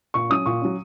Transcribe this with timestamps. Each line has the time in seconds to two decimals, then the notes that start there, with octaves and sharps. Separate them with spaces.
0.14 A#2 C#6
0.30 F#3 C#4 D#6
0.46 A#2 C#6
0.61 F#3 C#4